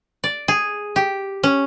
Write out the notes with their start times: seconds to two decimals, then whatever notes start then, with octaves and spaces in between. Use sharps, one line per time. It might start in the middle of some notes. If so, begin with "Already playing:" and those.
0.24 D5
0.48 G#4
0.96 G4
1.43 C#4